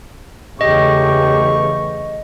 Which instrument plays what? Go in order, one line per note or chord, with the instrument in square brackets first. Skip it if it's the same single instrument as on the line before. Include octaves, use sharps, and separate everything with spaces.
[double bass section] E2 C#3 A3 [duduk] G4 [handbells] D#5 [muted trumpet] C#6